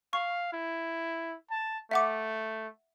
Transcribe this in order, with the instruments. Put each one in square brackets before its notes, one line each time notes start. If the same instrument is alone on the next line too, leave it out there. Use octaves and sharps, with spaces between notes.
[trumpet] F5 [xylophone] C#6
[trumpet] E4
A5
[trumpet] A3 [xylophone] E5 F#5 D6